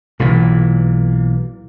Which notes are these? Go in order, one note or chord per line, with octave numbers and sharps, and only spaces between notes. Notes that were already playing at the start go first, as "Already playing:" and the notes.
B1 A#2 E3